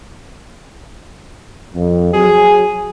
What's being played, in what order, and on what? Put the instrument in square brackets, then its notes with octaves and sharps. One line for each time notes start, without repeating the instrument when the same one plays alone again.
[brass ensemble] F2
[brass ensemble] F#3 F#4 G#5 [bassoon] G#4